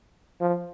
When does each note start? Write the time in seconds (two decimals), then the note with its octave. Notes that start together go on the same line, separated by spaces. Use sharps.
0.41 F3